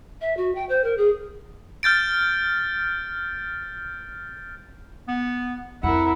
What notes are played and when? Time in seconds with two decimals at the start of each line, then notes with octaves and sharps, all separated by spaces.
0.21 E5
0.37 F#4
0.55 G5
0.69 C5
0.84 A#4
0.97 G#4
1.83 F6 G6 A6 D7
5.08 B3
5.83 F2 E4 A#4 F#5